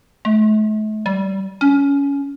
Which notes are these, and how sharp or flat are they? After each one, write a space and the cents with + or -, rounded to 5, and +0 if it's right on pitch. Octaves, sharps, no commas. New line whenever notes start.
A3 -40
G3 -20
C#4 +20